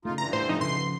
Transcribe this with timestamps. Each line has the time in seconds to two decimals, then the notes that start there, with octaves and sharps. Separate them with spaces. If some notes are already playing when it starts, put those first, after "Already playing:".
0.05 C#3 A3 D#4 F4
0.18 G2 D3 E3 A#5
0.33 A2 C5
0.49 A2 F3 C4 D#4
0.61 C#3 F3 C6